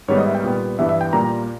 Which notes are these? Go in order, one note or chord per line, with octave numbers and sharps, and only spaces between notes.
G#2 D#3 G3 B3 C#5
D#5
E5
G5
A#2 G3 B3
G2 E3 G3 B3 E5
E5
G5
A#2 G3 A#3 A#5